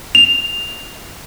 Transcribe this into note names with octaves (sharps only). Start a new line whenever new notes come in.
F7